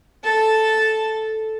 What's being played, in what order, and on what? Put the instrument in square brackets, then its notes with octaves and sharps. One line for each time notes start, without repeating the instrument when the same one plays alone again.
[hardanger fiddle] A4 A5